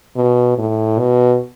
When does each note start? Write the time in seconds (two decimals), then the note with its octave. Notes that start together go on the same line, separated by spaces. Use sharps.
0.16 B2
0.58 A2
0.99 B2